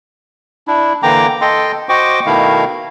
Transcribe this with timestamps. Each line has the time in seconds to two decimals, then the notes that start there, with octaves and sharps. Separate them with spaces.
0.68 D4 E4
1.03 D3 E3 A#3 G5 A#5 D6
1.41 A4 D#5 G5 C6
1.89 F#4 C5 D#5 G5 C#6 D6
2.26 B2 D#3 A3 E4 F5